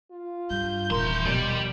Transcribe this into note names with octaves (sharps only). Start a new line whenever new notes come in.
F4
G2 G6
D#1 C3 E3 A#4 C6
B2 D#3 F3 G3 D5